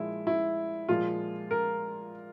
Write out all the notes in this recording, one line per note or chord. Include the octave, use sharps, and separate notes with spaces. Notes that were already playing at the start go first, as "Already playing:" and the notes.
Already playing: A#2 F3 G#3 E4
E4
A#2 F3 G#3 F4
A#4